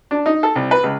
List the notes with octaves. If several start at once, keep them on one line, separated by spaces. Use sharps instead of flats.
D4
D#4
A4
C2
B4
C#2